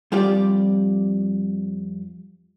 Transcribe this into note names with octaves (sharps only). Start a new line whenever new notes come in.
F2 G3 F4 G4 D5